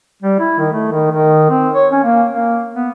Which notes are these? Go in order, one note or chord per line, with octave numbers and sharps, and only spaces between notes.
G3
E4
D#3
A3
D#3
D#3
C4
C#5
C#4
A#3
A#3
B3